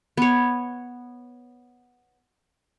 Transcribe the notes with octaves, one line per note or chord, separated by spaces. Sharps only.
B3 C#5